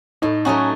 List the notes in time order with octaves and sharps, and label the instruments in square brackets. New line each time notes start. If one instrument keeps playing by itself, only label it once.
[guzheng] A2 [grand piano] D#4
[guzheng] F#3 A3 D#4 F#4 [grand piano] C#4